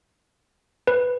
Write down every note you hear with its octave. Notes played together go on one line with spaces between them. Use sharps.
B4